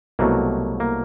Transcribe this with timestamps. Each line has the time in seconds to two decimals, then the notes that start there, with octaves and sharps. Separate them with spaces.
0.19 C2 B2 F#3 A3 A#3
0.80 A#3